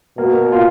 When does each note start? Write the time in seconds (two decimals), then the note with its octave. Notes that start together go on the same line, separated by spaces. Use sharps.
0.18 B2 A#3
0.52 F4